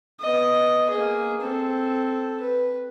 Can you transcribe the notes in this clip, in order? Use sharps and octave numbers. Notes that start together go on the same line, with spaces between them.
B3 D#5
A#3 G#4
C4 A4
B4